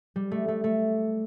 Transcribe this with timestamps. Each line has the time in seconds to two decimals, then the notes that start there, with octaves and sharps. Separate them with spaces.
0.16 G3
0.31 A3
0.48 A3
0.64 A3